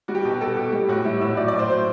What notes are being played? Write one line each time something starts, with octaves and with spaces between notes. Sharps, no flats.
G3 F#4
G4
F#4
B2
G4
G3 A4
B2 G4
G3 G4
A2 F#4
G3 E4
A2 E4
F#3 D5
D5
A2
C5
F#3 C5